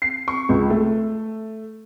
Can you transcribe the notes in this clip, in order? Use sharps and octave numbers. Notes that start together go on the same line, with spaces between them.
C7
C#6
C#2
A3